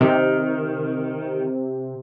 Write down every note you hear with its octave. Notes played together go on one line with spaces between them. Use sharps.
C3 D#3